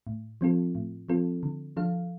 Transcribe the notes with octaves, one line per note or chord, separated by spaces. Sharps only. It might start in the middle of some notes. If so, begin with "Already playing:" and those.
A2
F3 C4 F4 A4
A2
F3 C4 F4 A4
D3
F3 D4 A4 F5